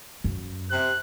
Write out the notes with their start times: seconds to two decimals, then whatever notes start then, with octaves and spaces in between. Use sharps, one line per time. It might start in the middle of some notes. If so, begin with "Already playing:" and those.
0.24 F#2
0.71 C3 F#6